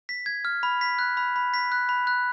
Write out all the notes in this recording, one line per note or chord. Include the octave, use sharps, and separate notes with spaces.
B6
G#6
F6
B5
B6
F#6
B5
B5
B6
F#6
B5
F#6